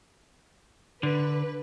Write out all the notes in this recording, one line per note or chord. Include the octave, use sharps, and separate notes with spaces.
D3 B4